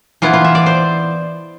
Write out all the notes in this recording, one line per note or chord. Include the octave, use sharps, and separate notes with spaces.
E3 B3 E4 F4
F4
E5
D5
C5